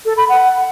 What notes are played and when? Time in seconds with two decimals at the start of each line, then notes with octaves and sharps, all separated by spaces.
0.05 A4
0.17 B5
0.29 F#5